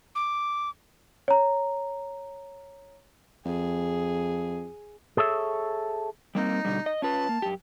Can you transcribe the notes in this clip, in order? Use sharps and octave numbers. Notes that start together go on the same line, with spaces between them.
D6
C#5 A#5
F2 G#4
G#4 A4 C#5 E5
G3 A#3 C4 D#4
B2 D3 G3
D#5
C#4 F4 B4 A5
A#3
F#2 G4